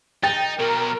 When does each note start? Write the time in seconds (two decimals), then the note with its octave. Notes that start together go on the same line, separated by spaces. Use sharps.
0.23 D#4 G5 A6
0.59 B2 F#3 A#4